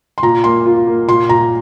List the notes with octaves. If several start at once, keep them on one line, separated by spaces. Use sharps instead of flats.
C6
A#2 A#5
A#3 C6
F4
A#3
A#2 C6
A#2 A#5